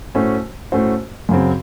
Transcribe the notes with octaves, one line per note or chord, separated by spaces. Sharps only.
A2 A3 C#4 F#4 C5
A2 A3 C#4 F#4 C5
F#2 C#3 F#3 C4